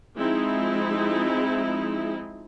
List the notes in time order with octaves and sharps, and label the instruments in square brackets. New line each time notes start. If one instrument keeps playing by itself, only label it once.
[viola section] F3 G#3 C4 D#4 E4